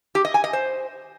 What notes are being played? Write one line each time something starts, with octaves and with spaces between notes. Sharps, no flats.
G4
D#5
G#5
D#5
C5